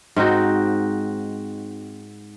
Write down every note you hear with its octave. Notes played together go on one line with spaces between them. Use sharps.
G#2 C4 D#4 F#4